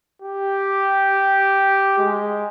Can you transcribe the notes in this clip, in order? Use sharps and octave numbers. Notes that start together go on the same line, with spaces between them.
G4
G#3